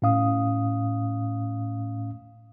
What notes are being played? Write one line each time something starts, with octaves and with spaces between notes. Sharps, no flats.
A2 C#4 F5 D#6